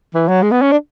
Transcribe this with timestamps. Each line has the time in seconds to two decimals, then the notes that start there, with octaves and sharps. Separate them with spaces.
0.14 E3
0.28 F#3
0.42 G#3
0.52 B3
0.62 C#4
0.72 D4